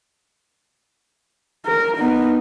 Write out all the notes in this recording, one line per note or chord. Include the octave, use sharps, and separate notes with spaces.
A#4
B3 D#4